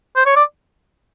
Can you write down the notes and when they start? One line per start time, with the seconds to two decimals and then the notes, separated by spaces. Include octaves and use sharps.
0.16 C5
0.26 C#5
0.36 D5